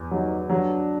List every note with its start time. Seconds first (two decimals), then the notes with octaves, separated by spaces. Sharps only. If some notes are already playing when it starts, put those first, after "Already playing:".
Already playing: E2
0.11 F#3 D#4
0.50 F#3 D4